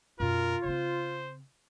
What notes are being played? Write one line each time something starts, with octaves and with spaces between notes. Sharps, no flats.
F#2 B2 F4 A#4
C#3 C4 C5